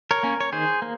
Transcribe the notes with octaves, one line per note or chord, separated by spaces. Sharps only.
A#4 C#5
A#3 C#4
C#5
D#3 G#4 C5
A#3